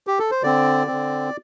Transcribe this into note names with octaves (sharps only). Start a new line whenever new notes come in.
G4
A4
C5
D3 C4 D5
D3 C4